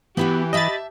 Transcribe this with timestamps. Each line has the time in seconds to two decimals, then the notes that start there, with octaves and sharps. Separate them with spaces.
0.17 E3 B3 E4 F#4 G4
0.53 D#5 E5 A5 B5 A6